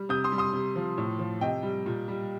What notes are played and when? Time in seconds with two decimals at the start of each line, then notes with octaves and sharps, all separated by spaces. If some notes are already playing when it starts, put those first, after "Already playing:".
Already playing: G3
0.09 C3 D#6 G6
0.24 C6 D#6
0.32 G3
0.38 C6 D#6
0.53 C3
0.76 F3
0.98 A2
1.19 F3
1.41 C3 D#5 G5
1.63 G3
1.86 A#2
2.08 G3